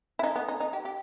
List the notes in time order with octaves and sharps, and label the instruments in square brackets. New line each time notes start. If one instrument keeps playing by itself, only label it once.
[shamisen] E4
D#4
B3
D#4
D#4
G4
G4